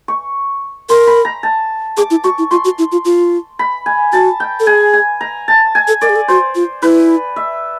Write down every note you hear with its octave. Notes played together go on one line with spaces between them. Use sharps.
C#6
A#4 C6
B5
A#5
A5
G#4 D6
E4
F#4 C#6
E4
F4 C6
F#4
E4
F4
F4
B5
G#5
F#4 A5
G5
A4
G#4 G#5
G#5
A#5
A5
G#5
A4
A#4 D5
G#4
A4
F#4 C5
F4
E4 B4
E5